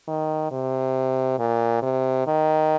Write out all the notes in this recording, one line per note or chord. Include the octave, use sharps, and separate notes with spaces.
D#3
C3
A#2
C3
D#3